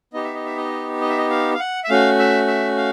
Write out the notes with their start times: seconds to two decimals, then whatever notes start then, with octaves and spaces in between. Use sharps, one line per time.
0.13 B3 D#4 G4 D#5
0.24 E5
0.34 D#5
0.46 E5
0.57 D#5
1.01 D#5
1.09 E5
1.18 D#5
1.30 F5
1.54 F5
1.59 F#5
1.84 E5
1.89 A3 C#4 F#4 F5
2.19 E5
2.47 E5
2.77 F5